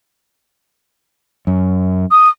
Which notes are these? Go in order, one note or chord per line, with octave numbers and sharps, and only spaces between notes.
F#2
D#6